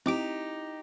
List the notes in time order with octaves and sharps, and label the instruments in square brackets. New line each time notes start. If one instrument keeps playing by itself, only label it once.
[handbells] C4 D6 D7 [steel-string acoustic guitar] D#4 G4 [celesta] E4